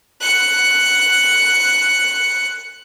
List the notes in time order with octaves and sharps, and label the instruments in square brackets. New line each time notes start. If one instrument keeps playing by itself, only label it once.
[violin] F#6 C#7